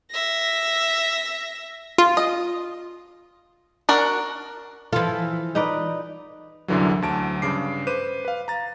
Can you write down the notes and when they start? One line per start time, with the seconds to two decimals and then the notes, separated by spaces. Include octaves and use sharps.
0.10 E5 A#6
1.98 F4
2.17 D#5
3.89 D4 F#4 A#4
4.92 E3 F3 F4 A4
5.55 D#4 B4 D5
6.68 C2 F#2 D3 E3 F#3
7.02 D2 F#3 A5 D7
7.42 G2 C#3 D6 C7
7.87 B4 C5 D6 D#7 E7
8.25 B4 F5
8.48 A#5 A6